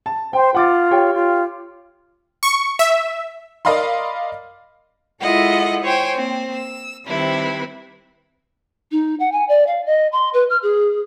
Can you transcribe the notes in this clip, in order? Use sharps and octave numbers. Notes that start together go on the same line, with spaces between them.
A5
C5 G5
F4 F#5 D6 A6
G4 C#5 G5
F4
C#6
E5
A#4 D5 D#5 F5 B5 C6
G#3 E4 F4 A4 D#5 F#5
C5 C#5 G5 G#5
A#3 C4
E6
C3 D#3 G3 C4 E4 B4
D#4
F#5
G#5
D5
F5
D#5
C6
B4
F6
G#4